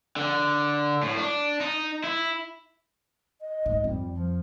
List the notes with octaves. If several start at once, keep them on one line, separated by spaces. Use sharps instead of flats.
D3
A2
D4
D#4
E4
D#5
G#2 A3
F2 G3
F3